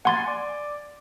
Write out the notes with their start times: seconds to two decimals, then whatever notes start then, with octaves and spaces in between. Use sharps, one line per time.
0.05 F#5 G#5 C6 A6
0.27 D5